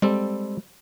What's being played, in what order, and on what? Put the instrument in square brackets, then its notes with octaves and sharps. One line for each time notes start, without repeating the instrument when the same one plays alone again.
[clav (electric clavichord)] G3 C4 A4 [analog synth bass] G#3